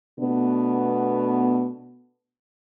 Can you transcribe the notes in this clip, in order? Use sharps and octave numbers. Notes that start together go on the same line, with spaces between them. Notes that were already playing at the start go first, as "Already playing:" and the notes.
B2 A3 B3 D4